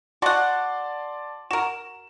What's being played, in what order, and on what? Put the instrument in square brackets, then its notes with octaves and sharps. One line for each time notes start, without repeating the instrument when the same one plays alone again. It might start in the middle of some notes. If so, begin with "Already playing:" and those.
[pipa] F#4 F#5 [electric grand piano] D5 A5 C6
[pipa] F#4 A#4 [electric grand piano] E7